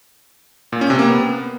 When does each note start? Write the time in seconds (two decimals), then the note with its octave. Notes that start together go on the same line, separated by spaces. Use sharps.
0.72 A#2
0.81 C#4
0.90 C3
0.99 A#3
1.07 B3